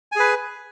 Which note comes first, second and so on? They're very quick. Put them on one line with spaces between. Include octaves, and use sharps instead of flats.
G#5 G#4 B4